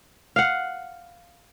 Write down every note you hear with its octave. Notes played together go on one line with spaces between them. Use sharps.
F5 F#5